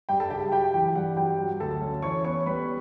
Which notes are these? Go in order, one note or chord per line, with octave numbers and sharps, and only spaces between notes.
G2 G4 G5
A4 A5
C#3 G4 G5
F#3 G4 G5
E3 G4 G5
G2 F#5
F#3 G4 G5
F#3
D2 A4 A5
C#4
E3 C#5 C#6
B3 C#5 C#6
G3 B4 B5